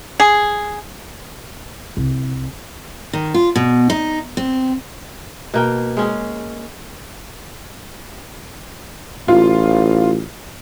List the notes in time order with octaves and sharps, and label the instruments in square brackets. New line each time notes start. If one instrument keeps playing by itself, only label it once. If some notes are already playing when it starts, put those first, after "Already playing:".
[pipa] G#4
[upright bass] C2
[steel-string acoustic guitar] D#3
F4
B2
D#4
C4
[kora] B2 A#3 G5
G#3 C#4 G#4
[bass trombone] A1 [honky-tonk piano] F4